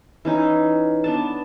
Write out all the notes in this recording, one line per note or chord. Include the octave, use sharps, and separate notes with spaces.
E3 C#4 D#4
B3 D4 A5